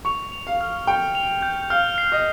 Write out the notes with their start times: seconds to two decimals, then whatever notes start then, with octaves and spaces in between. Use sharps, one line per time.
0.05 C#6 F7
0.32 F7
0.47 F5
0.61 F6
0.87 G5 C#7
1.15 F7
1.42 G6
1.70 F5 F6
1.98 C7
2.12 D#5